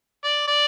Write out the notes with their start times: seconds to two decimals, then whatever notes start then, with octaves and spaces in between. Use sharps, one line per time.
0.24 D5
0.47 D5